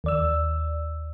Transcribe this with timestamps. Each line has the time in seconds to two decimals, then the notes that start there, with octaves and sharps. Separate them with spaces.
0.04 D#2 D5 E6